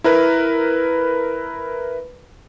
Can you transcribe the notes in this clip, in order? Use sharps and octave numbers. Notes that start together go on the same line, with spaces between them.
E4 A#4 B4